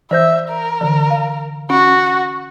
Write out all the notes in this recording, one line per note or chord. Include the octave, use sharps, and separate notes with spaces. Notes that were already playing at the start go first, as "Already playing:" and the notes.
E3 C5 E5 G6
A#4
D3 E3
F5
C#4 F#4